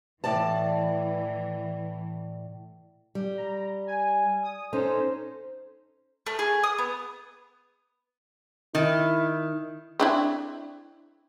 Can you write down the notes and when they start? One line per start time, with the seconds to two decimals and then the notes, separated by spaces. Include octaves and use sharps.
0.24 A2 E3 D5 A5
3.15 G3
3.37 A#5
3.87 G#5
4.43 D#6
4.73 C#4 D#4 A4 C5
6.27 A3
6.39 G#4
6.63 D#6
6.78 B3
8.75 D#3 E4
10.00 C4 D4 E4